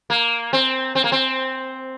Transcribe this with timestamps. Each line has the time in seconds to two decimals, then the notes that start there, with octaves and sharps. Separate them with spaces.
0.10 A#3
0.53 C4
0.95 C4
1.04 A#3
1.12 C4